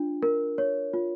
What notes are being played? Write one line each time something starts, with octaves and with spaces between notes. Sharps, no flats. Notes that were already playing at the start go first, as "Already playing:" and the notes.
Already playing: D4 F4
A#4
C#5
F4